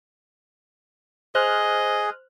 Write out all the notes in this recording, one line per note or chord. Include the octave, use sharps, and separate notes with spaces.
G#4 C5 D#5 F6 F#6